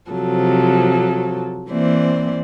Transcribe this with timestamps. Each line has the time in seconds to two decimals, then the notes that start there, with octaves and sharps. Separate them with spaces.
0.11 C3 F3 F#3 A4
1.70 E3 A#3 C4 C5 D5